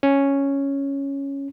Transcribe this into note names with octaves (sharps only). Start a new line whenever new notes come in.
C#4